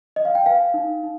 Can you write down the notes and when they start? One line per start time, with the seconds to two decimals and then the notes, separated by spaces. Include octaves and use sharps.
0.16 D#5
0.25 F5
0.35 G5
0.46 B4 F5 G#5
0.74 D#4
1.03 D#4